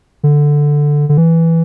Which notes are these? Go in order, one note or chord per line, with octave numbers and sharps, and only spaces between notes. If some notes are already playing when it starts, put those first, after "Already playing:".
D3
D3
E3